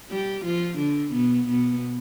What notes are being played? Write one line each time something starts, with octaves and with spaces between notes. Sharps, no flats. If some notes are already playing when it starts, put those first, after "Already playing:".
G3 G4
F3 F4
D3 D4
B2 B3
B2 B3